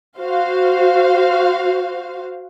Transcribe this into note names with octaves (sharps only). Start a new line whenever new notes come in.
F#4 C5 F5